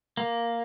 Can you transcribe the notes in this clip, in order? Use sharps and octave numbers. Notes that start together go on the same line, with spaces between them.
A#3